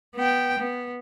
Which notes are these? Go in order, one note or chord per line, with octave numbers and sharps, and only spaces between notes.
B3 G5
B3